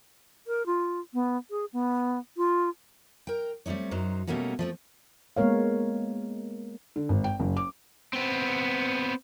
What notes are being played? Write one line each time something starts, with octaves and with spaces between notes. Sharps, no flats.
A#4
F4
B3
G#4
B3
F4
A#4 G5
G3 A3 C4 D#4 C#5
F#2 F#3 D#4 C5
B2 G3 A3 A#3 C#4 F#4
F3 A3 C4
G#3 A#3 B3 A#4 C#5 F5
D3
G#1
G5
F#1
D6
B3 C4